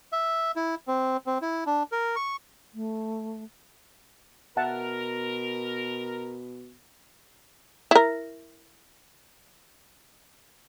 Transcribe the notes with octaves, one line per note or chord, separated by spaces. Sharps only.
E5
E4
C4
C4
E4
D4
A#4
C#6
A3
B2 A#4 E5 F#5 A5
E4 A#4